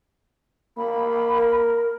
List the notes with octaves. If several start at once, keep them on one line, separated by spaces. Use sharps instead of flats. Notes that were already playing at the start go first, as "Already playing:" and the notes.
A#3 B5
A#4